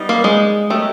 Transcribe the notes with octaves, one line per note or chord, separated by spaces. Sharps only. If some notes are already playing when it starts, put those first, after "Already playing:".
Already playing: G3 B3 D#4
A#3
G#3
F#3 A3 B3 D#4 G4 A#4